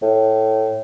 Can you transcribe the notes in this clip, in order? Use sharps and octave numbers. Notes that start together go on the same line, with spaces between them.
A2